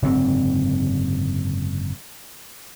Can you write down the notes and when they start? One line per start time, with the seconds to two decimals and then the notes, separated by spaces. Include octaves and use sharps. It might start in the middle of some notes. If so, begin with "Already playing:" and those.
0.02 F#1 G#2 D3 C4